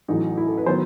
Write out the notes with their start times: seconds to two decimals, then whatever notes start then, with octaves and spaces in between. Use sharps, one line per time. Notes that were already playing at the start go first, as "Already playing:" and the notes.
0.08 A1 A2 F#3 D#4
0.37 E4
0.47 A4
0.58 B4
0.66 D#3 F#3 B3 C5